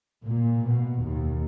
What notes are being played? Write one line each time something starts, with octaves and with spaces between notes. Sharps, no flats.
A#2
B2
D#2